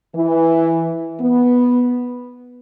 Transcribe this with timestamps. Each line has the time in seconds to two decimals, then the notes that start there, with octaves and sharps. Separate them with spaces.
0.15 E3
1.21 B3